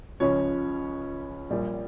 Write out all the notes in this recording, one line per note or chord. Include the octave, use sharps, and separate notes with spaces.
C#2 C#3 F3 C#4 C#5
A#1 A#2 G3